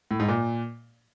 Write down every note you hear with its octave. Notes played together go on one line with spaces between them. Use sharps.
A2
G#2
A#2